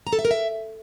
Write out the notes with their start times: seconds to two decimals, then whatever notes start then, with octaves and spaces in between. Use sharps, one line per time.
0.07 A#5
0.13 A4
0.19 E5
0.25 A#4
0.31 E5